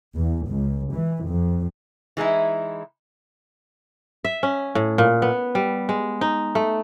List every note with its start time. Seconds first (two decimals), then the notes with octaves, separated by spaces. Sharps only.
0.16 E2
0.49 C#2
0.94 E3
1.29 F2
2.17 E3 G#3 D#4 E4
4.25 E5
4.43 C#4
4.75 A2
4.98 A#2
5.22 B3
5.55 G3
5.89 G#3
6.21 D#4
6.55 A3